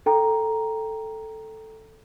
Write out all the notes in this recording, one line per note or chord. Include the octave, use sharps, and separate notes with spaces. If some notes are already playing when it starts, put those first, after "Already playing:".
A4 G5 A#5